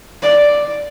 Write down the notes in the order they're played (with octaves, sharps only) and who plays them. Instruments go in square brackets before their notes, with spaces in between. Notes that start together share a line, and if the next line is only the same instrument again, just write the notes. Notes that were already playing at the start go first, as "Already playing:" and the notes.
[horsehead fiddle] D5